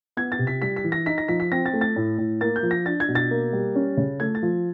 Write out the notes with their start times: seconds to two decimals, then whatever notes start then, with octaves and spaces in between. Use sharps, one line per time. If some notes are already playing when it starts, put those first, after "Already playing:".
0.17 B3 G#6
0.32 A6
0.39 C3
0.47 B6
0.62 G3 B6
0.76 B6
0.84 E3
0.92 A#6
1.06 D#4 B6
1.18 A#6
1.28 F3 B6
1.40 B6
1.52 C4 A#6
1.66 A6
1.73 A3
1.81 A6
1.96 A2
2.18 A2
2.41 A#3 A6
2.56 G6
2.63 F3
2.71 A#6
2.86 D4 A6
3.00 G#6
3.08 B2
3.15 A6
3.31 A#3
3.53 G3
3.75 C#4
3.97 C#3
4.20 A3 G#6
4.35 A6
4.42 F3